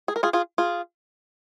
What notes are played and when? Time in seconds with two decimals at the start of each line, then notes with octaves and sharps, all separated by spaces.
0.08 G#4
0.16 A#4
0.23 F4 G#4
0.33 F4 G#4
0.58 F4 G#4